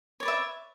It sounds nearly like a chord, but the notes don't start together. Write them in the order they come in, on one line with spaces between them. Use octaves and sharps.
C#5 D5 B4 E5